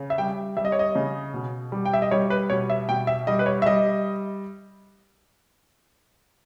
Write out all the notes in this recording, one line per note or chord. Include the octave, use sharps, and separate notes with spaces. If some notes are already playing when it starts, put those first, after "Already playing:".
Already playing: C#3
E5
G3 G5
G3 E5
D#5
C#5
D#5
C#3
B2
G3
G5
E5
D#5
G3 C#5
B4
B2 C#5
E5
B2 G5
E5
G3 D#5
B4
C#5
E5
G3 D#5